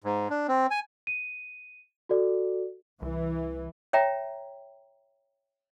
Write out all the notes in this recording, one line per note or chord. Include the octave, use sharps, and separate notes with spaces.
G#2
D4
C4
G#5
D#7
F#4 A4 D5
C2 E3
C#5 E5 G5 A#5